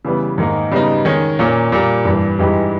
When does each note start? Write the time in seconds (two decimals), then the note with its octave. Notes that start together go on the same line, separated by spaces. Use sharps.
0.05 C#3 E3 G3 B3
0.38 G#2 D#3 A#3 D#4
0.72 C#3 G3 B3 D#4
1.05 D#3 G#3 C#4
1.39 A#2 A#3 C#4
1.72 A#2 G3 A#3
2.05 G2 E3 G3
2.39 G2 E3 G#3 D#4 G4